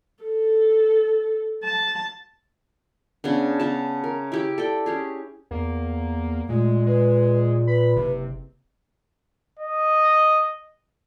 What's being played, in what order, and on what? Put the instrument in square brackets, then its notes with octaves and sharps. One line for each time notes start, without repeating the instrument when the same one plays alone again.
[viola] A4
A5
[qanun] C#3 B3 D4
C#3 B3 A5
A#4
E4 G4 D6
A4 D5 G5
C#4 G4 G#4
[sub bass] E2 [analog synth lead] A#3
[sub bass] A#2 [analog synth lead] G#3 [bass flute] A3
[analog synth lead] G#3 [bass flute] B4
[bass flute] B4 [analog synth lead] B5
[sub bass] F#1 [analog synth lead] C3
[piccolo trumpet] D#5